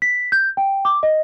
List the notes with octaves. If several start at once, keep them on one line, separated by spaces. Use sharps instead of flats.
B6
G6
G5
D6
D#5